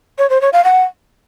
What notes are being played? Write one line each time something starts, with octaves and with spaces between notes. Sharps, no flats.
C#5
C5
C#5
F5
F#5